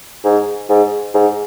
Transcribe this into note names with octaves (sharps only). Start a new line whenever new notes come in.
G#2
G#2
G#2